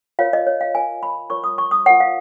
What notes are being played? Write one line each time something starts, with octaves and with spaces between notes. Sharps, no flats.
F4 A#4 C#5 F5
D#5
C#5
F5
F4 A#4 C#5 G#5
B5
F4 A#4 C#5 C#6
D#6
C#6
D#6
F4 A#4 C#5 F#5
F5